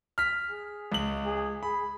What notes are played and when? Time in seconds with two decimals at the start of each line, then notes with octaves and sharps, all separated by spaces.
0.18 F6 B6
0.50 G#4
0.92 C#2 F#7
1.26 G#4
1.63 G#4 B5